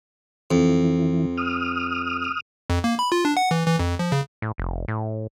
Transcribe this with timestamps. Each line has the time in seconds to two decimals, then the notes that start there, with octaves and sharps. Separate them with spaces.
0.51 F2 E3
1.37 D#6 F6
2.70 F2
2.84 A#3
2.99 B5
3.12 F4
3.25 D4
3.37 F#5
3.51 E3
3.66 E3
3.79 F2
3.99 F3
4.12 C#3
4.42 A2
4.58 F1
4.88 A2